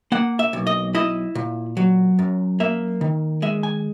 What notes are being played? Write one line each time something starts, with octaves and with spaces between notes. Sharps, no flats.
A#3 F#5
E5
B1
D#5
E4 D#5
A#2
F#3
F#2
A#3 E5
D#3
G#3 E5
G#5